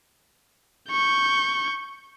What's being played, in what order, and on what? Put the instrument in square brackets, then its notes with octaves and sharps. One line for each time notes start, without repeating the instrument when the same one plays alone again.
[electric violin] C#6 G6